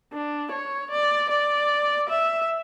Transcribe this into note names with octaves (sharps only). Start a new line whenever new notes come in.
D4
C#5
D5
D5
E5